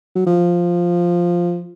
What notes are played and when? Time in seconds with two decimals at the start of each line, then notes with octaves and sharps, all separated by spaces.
0.16 F#3
0.27 F3